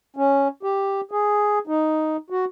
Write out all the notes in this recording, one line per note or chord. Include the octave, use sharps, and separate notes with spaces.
C#4
G4
G#4
D#4
F#4